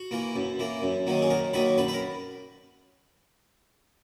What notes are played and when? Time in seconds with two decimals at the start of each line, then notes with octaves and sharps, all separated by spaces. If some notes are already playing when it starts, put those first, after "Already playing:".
Already playing: F#4
0.11 E3 A#3
0.36 F#2
0.59 E3 A#3
0.82 F#2
1.07 D#3 F#3 A#3
1.22 G#4
1.30 F#2 A#4
1.54 D#3 F#3 A#3 B4
1.78 F#2 B4
1.88 B4
1.93 A#4